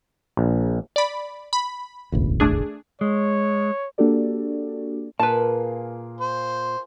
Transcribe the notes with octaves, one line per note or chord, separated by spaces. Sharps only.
A#1
D5 B5
B5
E1 A1 D2
A3 D4 G#4
G#3 C#5
A#3 D4 F#4 G4 A4 D5
A#2 A#3 F4 G#4 B4 A5
C5